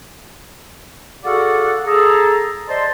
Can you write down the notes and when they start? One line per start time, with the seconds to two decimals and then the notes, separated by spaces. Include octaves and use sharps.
1.25 F#4 G#4 A4 D5 F5 F#5
1.86 G#4 A4 A#5
2.69 C5 D5 D#5 A5 C6